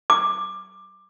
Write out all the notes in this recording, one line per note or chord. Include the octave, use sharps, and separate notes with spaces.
D6